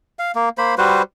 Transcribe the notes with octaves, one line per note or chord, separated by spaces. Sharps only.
F5
A#3
A#3 C5 B5
G3 F#4 B4 C5